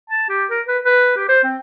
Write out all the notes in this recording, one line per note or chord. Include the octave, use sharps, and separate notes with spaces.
A5
G4
A#4
B4
B4
G4
C5
C4